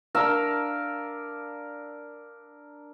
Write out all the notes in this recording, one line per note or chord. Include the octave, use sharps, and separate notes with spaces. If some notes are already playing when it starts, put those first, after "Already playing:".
D4 A#4 F5 E6